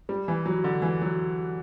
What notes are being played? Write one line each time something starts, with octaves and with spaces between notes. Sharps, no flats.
G3
E3
F#3
D3
E3
F#3